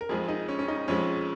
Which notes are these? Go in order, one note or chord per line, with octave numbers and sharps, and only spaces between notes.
A#4
F2 F3 G#3 G#4
D#4
C#4
C#4
D#4
F2 F3 G#3 C#4